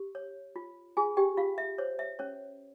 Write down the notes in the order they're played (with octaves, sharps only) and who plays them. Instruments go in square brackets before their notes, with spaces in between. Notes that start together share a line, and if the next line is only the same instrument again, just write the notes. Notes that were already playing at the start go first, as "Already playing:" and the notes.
Already playing: [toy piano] G4
C#5
F4
F4 G#4 G#5
G4 G5
F4 F5
E5
C5 C#5
E5
C#4 C#5